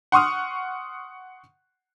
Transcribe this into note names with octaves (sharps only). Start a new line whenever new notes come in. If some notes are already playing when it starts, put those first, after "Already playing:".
F#5 C6 C#6 D#6 F6